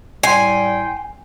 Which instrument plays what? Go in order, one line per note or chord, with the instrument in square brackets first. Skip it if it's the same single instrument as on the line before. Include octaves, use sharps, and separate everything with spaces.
[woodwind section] A2 G3 G5 [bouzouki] G#5 [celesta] C6 C7